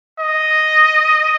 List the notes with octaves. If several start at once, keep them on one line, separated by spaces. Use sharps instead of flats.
D#5